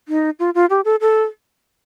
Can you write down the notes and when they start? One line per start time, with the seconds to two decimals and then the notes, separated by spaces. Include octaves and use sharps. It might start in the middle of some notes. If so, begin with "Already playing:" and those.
0.08 D#4
0.39 F4
0.55 F4
0.70 G4
0.85 A4
1.01 A4